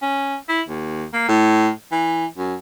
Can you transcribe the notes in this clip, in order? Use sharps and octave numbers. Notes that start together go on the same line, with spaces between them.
C#4
E4
D#2
A#3
A2
E3
F#2